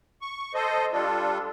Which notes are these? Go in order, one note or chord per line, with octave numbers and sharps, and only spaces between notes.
C#6
A4 C5 D#5
G3 D4 F4 A4